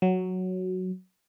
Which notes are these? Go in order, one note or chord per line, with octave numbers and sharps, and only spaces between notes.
F#3